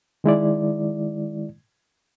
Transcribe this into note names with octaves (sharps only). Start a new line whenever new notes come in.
D#3 G#3 E4 D5